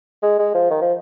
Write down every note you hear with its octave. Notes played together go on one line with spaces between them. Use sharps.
G#3
G#3
F3
D#3
F3